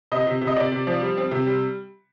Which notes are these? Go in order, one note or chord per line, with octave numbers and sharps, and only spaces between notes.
C3 D#5
C3
C3
D#5
C3 D5
C3
F3
G3
C4
C3
G3